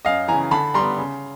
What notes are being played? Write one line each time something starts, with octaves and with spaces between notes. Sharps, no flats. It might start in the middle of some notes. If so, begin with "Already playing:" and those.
F#2 D#5 F5
C#3 E3 G#5 A#5
D3 A5 B5
G3 B3 A#5 C6
C#3